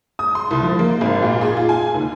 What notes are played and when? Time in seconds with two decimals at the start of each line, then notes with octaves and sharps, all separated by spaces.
0.19 D#6
0.35 C6
0.51 C2
0.63 F3
0.79 A#3
1.01 G#1
1.23 A#2
1.41 G#4
1.57 F4
1.69 G#5
1.94 D#2